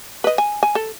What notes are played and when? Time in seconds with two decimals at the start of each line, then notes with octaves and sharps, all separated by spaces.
0.24 B4 D#5
0.38 G#5
0.63 G#5
0.75 A4